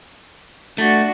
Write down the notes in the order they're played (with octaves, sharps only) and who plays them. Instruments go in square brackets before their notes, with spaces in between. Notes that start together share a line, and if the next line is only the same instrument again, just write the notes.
[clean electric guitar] A3 [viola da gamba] D4 F#4